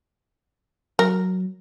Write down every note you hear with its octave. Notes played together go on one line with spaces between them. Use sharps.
F#3 A#4